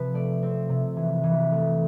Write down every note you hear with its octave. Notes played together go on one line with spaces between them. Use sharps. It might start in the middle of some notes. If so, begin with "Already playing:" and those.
Already playing: C3 F3 B4
A3 D5
C4
C3
E3
E3
A3